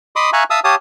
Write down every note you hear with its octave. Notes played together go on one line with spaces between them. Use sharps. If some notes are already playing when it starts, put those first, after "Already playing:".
D#5 B5 C6 D6 D#6
E5 F5 G#5 A#5 C#6 F#6
E5 F5 A5 D#6 E6
G4 C#5 F5 A5 D#6